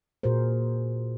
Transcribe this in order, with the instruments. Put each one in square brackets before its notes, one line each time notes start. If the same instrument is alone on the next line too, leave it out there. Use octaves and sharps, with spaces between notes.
[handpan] A#2 F#4 G#4 A#4 C5